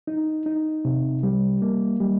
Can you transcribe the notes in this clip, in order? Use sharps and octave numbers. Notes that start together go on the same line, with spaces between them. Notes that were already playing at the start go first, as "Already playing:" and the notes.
D#4
D#4
C3
G3
A#3
G3